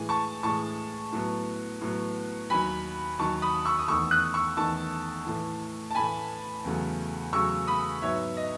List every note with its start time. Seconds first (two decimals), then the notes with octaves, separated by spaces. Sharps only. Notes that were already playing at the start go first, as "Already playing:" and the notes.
Already playing: A2 E3 G#3 G#5
0.09 A5 C#6
0.43 A2 E3 G#3 A5 C#6
1.12 A2 F#3 B3
1.81 A2 F#3 B3
2.50 D#2 D#3 F#3 G#5 B5
3.19 D#2 D#3 F#3 A5 C#6
3.42 B5 D#6
3.65 C#6 E6
3.79 D#6
3.88 E2 D#3 A3 C#6 E6
4.11 D#6 F#6
4.34 C#6 E6
4.57 E2 D#3 A3 A5 C#6
5.26 A2 E3 A3
5.91 A5
5.95 A2 E3 A3 G#5 B5
6.64 E2 C#3 F#3 A3
7.33 E2 C#3 F#3 A3 C#6 E6
7.67 B5 D#6
8.02 G#2 F#3 B3 C#5 E5
8.37 D#5